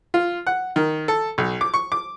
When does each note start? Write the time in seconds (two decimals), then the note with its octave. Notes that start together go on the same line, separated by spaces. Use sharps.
0.14 F4
0.47 F#5
0.76 D#3
1.08 A4
1.38 B1
1.61 D6
1.74 C#6
1.92 D6